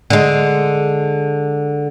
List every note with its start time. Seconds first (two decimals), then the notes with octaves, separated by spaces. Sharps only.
0.10 D3 G#3